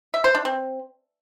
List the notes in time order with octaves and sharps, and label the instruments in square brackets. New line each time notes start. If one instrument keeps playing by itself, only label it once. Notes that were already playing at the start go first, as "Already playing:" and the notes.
[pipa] E5
C5
D4
C4